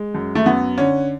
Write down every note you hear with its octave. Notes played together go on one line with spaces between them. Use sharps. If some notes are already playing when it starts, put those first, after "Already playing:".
Already playing: G#3
F#2
A3
F#2 B3
D3 C#4